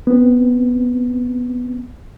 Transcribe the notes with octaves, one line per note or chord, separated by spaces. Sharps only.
B3 C4